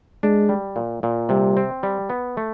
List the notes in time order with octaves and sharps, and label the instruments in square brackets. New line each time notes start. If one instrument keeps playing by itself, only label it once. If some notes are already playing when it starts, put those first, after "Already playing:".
[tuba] G#3 [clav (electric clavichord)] D4
[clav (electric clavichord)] G3
A#2
A#2
[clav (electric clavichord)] C3 [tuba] G3
[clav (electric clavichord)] C4
G3
B3
A3